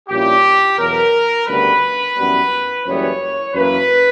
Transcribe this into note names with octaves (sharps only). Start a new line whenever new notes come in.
A#1 A#2 G3 C#4 E4 G4
E2 B2 F#3 A#4
D2 C#3 G3 B3 B4
F#2 E3 G3 B3
F#1 F#2 E3 G3 B3 C#5
F#2 E3 A#3 B4